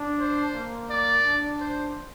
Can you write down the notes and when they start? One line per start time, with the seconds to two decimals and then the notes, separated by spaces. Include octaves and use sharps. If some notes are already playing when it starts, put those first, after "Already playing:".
Already playing: D4
0.19 C5
0.54 A#3
0.90 D5
1.26 D4
1.60 C5